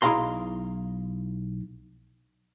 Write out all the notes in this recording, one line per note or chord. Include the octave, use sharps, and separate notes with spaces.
B1 E4 G#4 F5 A#5 C6